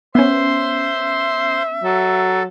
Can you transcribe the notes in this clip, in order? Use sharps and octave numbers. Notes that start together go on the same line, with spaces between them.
B3 C#4 C5 E5 C6
F#3 A4